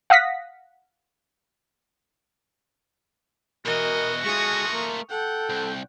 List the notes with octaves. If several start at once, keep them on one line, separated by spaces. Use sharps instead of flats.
F5 F#5 D#6 A#6 B6
B2 E3 F#4 A#4 D#5
G#3 A3 F4 C#6 D#6
A#3
A4 F#5 G5
C2